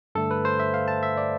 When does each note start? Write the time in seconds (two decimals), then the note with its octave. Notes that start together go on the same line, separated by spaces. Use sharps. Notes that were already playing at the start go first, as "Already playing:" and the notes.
0.15 G2 D3 A3 A4
0.31 B4
0.45 C5
0.60 E5
0.74 F5
0.88 A5
1.03 E5
1.17 D5